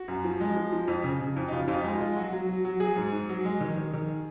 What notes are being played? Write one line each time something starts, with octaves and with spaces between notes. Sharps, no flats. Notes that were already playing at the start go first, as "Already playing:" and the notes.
Already playing: F#4
F#2
F3
G#3
F3
F3
F2
C#3
C#3
F2
D#4
C#3 F4
F2 F4
D#4
G#3
F4
G#3
F#3 F#4
F#3
F#3
F#3
F#3 G#4
G#2
G#2
F#3
G#3
D#3
D#3
D#3